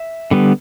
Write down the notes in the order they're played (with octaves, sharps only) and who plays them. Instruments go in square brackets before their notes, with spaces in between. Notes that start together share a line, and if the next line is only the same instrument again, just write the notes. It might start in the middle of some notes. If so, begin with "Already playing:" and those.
Already playing: [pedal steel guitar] E5
D3 G3 B3